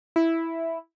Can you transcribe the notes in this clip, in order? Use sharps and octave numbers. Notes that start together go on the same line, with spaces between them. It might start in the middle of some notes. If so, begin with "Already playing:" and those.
E4